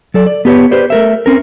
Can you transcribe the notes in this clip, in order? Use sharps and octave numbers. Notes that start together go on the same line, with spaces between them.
F#3 A4 D5
D5
B3 G4 B4 C#5
G4 B4 C5 D5
A3 A#4 E5
C4 C#4 A#4